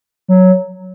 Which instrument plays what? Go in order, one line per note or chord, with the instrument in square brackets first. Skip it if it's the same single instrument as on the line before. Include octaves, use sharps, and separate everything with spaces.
[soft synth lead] F#3